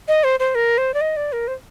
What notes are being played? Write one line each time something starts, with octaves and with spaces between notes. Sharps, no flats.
D#5
C5
C5
A#4
C5
D5
D#5
D5
A#4
C5